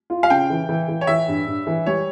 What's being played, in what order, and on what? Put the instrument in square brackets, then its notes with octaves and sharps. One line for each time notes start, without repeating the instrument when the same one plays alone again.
[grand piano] F4
[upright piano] F5
[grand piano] C#3 [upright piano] G5
[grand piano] E3
E3
E3
[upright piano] C#5
[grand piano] E3 [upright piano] E5
[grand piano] G2
G2
E3
[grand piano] G3 [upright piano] C#5